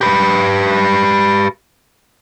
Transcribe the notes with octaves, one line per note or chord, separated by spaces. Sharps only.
G4 B4